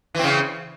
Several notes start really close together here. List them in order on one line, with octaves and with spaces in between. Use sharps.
E3 C4 C#3